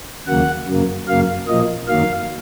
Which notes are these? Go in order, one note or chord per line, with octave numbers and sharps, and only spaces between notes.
D#2 C#3 F#3 A#3 F#5
F#2 C#3 F#3 A#3
F#2 C#3 F#3 A#3 F5
A#2 F3 A#3 D#5
F#2 D#3 F#3 A#3 F5